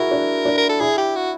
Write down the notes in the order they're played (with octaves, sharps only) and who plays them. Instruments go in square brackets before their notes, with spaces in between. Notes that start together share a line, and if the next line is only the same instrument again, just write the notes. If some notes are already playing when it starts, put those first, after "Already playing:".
Already playing: [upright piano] E4 F#4 G#4 [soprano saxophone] A#4
[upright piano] D4
D4
[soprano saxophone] A#4
A4
[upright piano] E4 [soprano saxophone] G#4
[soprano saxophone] G4
F#4